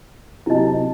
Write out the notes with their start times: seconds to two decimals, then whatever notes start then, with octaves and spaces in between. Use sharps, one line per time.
0.46 C3 F#3 E4 D#5 A5